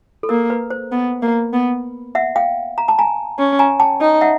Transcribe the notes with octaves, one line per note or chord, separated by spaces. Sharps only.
A4
A#3 A#4
B4
C5
B3
A#3
B3
E5 F#5
F5 G5
A#5
A5
G#5 A#5
C#4
G#5 A#5
G5 A5
D#4
E5 F#5